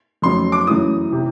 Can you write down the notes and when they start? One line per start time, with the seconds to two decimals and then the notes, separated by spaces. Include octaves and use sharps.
0.22 F2 C#3 F#3 A3 C6
0.52 D6
0.67 F#2 C#3 E3 A3 D#6
1.11 C3 E3